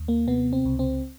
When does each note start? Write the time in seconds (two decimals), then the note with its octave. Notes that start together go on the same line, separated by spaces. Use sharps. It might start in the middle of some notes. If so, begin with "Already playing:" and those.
Already playing: D#2
0.08 A#3
0.28 C3 B3
0.53 C4
0.65 C#2
0.79 C4